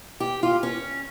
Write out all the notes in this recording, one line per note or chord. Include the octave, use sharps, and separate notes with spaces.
G4
F4
C#4